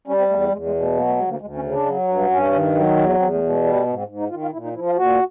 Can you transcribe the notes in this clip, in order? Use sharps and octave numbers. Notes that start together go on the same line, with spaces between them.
G3 C#4
C4
E2 A3
A3
E2 G#3
G#3
B2
A3
F#3 A#3
A3
D2 G#3
A#3
D2 G#3
C#4
C#3
D4
F#3
G2
G2 C#4
D#3
F#3
E2
E2 C4
A3
B2
G#3
G3 A3
A3
G#2 B3
C4
G#2
D#4
D#3 F4
F4
A#2 E4
D#4
F3 E4
F4
A#2 F#4